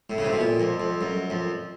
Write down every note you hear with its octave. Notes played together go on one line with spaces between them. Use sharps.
A2
C#3
C3
B2
A#2
F2
F2
F#2
F2